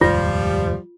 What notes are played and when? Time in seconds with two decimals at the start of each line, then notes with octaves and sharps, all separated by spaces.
0.01 F1 D#2 G#2 F3 G3 F4